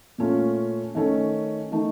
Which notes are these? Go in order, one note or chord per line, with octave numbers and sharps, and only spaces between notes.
A#2 A3 C#4 F4
D#3 A3 C#4 A4
D#3 A3